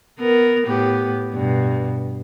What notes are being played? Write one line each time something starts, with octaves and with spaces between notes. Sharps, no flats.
B3 A#4
A2 B3 G4
G2 B2